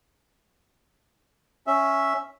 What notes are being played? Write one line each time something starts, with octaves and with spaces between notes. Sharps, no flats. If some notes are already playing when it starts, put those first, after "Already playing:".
C#4 E5